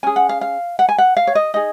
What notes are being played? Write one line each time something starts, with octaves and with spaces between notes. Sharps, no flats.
C#4 G#4 G#5
F#5
F5
F5
F#5
G#5
F#5
F5
C#5
D#5
D#4 G#4 D#5